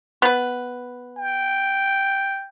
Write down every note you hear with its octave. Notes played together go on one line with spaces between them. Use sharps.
B3 B4
G5